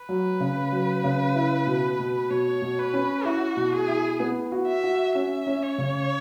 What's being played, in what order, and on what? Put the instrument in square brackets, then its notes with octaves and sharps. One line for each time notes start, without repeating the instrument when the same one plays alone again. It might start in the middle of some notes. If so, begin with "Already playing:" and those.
Already playing: [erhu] B4
[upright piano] F#3
C#3
F#3
C#3
E4
B2
B2
[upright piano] B2 [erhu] C#5
[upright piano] B2
[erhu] B4
[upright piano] C#4
[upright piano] E4 [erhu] F#4
[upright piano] B2
[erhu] G#4
[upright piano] E4
B3
F#4
[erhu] E5
[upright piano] F#4
[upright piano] C#4 [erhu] E5
[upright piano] C#4
[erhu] C#5
[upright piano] C#3